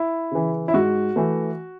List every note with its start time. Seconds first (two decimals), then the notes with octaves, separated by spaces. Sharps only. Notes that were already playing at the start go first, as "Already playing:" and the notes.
Already playing: E4
0.31 C#3 E3
0.68 E4
0.74 G#2 F#4
1.16 E3 A3